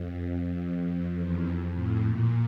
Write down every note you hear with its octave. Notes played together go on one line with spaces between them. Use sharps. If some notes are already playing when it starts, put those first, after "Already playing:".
Already playing: F2
F2
E2
F2
A2
A#2